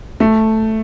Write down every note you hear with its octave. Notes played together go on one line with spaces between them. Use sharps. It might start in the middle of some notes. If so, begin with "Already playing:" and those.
A3